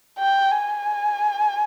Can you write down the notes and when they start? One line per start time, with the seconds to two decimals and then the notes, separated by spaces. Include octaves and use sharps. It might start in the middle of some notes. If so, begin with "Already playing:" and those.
0.19 G5
0.51 G#5